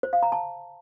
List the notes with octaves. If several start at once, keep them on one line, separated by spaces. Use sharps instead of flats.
C5
F5
A#5
A5